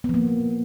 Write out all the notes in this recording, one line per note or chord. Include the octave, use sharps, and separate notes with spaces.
F3 A#3 B3